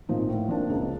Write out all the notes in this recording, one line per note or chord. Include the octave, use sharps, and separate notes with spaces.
A#2 F3 A#3 D#4
A2
F3 A#3 D4
C#2